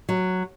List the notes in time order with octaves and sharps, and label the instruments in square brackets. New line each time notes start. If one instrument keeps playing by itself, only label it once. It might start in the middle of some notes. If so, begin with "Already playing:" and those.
[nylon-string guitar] F#3